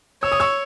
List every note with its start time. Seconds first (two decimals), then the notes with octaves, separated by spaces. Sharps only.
0.23 C#5 E6
0.32 D#6
0.40 C#6 E6